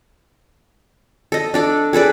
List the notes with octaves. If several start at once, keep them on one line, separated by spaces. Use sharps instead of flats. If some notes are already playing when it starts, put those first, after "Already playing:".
A4 D#5
D4 A4 D5
G#4 A4 B4 D5